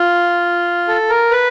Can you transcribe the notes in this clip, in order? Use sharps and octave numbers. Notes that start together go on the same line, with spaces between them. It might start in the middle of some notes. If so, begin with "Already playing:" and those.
Already playing: F4
A4
A#4
B4